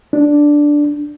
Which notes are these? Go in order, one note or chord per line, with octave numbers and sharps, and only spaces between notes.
D4